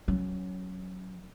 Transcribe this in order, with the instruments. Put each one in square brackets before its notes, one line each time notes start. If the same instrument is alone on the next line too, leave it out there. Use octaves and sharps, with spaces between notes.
[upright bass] F#3 C#4